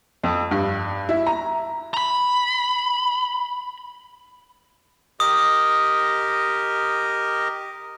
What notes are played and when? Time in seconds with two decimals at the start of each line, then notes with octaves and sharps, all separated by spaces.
0.24 F2
0.51 G2
1.09 E4
1.27 A#5
1.94 A#5 B5
5.20 G4 A#4 D#5 D#6